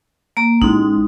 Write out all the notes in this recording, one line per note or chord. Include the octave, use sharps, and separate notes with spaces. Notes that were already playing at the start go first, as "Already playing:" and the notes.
A#3 A#5
A1 G#3 D#4